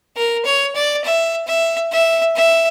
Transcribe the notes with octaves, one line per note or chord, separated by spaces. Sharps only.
A#4
C#5
D5
E5
E5
E5
E5